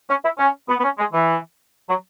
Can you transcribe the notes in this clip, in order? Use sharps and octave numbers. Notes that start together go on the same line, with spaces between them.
C#4
E4
C#4
B3
B3
C#4
G#3
E3
F#3